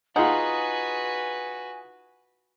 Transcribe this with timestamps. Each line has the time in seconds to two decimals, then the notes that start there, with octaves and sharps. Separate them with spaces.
0.16 D#4 F4 F#4 G#4 B4 F#5 G#5